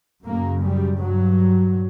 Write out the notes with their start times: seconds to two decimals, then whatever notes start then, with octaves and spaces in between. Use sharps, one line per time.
0.24 F#2 C#3 A#3
0.63 G3
0.99 G2 F#3